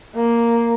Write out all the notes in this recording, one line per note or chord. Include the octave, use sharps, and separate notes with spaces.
A#3